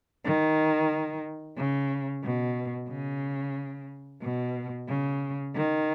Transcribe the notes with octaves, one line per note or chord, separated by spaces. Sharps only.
D#3
C#3
B2
C#3
B2
C#3
D#3